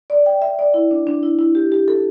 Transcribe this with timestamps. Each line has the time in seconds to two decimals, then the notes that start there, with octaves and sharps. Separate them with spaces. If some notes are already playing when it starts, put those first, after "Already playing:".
0.10 D5
0.26 G5
0.42 E5
0.59 D5
0.74 E4
0.91 D4
1.07 D4
1.23 E4
1.39 E4
1.55 G4
1.72 G4
1.88 A4